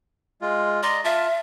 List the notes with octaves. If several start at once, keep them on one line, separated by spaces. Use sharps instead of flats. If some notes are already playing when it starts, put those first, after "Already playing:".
G#3 F4
D5 D#5 A#5 C6
F4 E5 A5